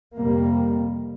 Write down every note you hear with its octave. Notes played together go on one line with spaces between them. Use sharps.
F2 C3 G3 A#3